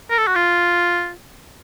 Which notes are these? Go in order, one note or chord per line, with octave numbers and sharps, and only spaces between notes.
A#4
A4
F#4
F4